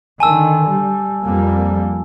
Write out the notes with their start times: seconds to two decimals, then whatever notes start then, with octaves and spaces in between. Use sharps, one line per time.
0.20 D3 D#3 G#5 A5 E6
0.67 G3
1.23 F2 G3 A#3